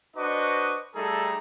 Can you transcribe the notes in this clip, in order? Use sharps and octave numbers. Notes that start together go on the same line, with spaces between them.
D4 F#4 B4 C5 D#5 C#6
G3 A3 D#4 G#4 A4 A#5